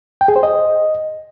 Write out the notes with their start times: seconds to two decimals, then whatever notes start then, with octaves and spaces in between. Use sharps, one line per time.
0.21 G5
0.28 G#4
0.36 C5
0.43 D#5